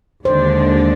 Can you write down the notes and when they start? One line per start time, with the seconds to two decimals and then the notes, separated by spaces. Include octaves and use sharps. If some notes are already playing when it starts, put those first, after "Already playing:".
0.25 D#2 D3 G#3 D4 C5